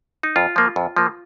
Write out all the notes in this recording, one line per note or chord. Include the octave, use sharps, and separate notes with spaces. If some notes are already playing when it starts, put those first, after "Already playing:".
D#4
F2 F4
F3 A#3
F2
F3 A#3